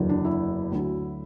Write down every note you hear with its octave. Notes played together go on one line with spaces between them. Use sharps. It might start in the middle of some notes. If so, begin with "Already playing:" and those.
Already playing: F#1 E2 D3 F#3
D4
E4
D2 D3 F#3